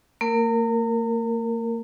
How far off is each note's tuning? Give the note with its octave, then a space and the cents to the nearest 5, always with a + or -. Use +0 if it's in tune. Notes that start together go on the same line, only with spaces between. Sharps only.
A#3 -40 A#4 -10